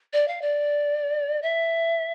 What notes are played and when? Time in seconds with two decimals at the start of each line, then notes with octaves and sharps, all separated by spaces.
0.13 D5
0.28 F5
0.42 D5
1.42 E5